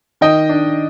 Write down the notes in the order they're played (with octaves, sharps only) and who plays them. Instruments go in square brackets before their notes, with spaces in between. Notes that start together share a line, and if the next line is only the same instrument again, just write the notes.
[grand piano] D#3 [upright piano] D#5 G5
[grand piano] D4